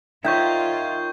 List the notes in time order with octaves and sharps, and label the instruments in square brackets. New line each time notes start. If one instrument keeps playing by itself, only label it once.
[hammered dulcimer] D#3 [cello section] F4 [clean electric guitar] C#5 D#5 E5 [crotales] C#6 G6 G#6